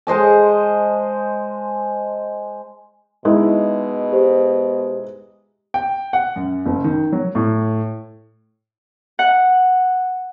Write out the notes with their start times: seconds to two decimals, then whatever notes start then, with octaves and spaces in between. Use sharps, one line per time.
0.07 G#3 C5 D#5 A5
3.25 B2 G#3 D#4 E4
4.12 G4 C5
5.74 G5
6.13 F#5
6.36 F#2
6.66 F#1
6.84 D#3
7.12 F#3
7.35 A2
9.19 F#5